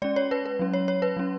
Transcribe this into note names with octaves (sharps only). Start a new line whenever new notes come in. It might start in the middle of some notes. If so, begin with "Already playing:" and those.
G#3 C#4 D5
C#5
B4
B4
F#3 C#4
C#5
C#5
B4
F#3 C#4